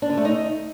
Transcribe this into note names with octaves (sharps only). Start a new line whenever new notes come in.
D4
D3
A3
D#4